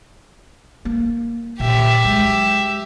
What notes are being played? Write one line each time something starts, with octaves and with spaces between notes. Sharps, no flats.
A#3
A#2 D3 G4 E5
F#3 G#3